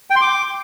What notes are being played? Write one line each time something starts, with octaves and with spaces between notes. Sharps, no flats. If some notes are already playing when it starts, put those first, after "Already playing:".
G5
C6
D6